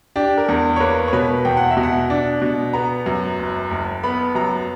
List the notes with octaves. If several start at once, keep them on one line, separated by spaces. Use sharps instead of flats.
D4 G4
A#4
E2
C#5
A#3 B4
C#5
B2 B4
E2 G5
F#5
E5
B2
F#5
D4
B2
B3 A#5
F#2
F#1
F#1
B3 B5
F#2 A#5